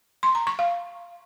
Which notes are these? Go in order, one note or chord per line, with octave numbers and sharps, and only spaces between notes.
C6
A#5
C#6
F5